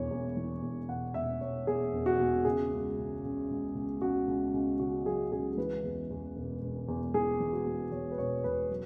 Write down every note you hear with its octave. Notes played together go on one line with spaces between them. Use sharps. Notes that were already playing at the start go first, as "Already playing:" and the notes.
Already playing: E1 E2 E3 C#5
E2
E3
E2
E1 F#5
E1 E5
E1 C#5
E2 G#4
E1
F#4
E2
C#3 G#4
C#2
C#3
C#3
C#2
C#2
C#2 F#4
C#2
C#2
C#3 F#4
F#3 G#4
C#2 G#4
G#4
E3 B4
E2
E2
E1
E1
E2
E3 G#4
E3
F#4
E2
E2 C#5
B4
E1 C#5
E1 B4
F#3